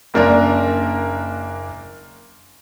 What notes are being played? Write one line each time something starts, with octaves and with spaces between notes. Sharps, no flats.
F#1 A#3 D4 A#4